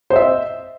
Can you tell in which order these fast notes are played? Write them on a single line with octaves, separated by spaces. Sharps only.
C5 D#5 E5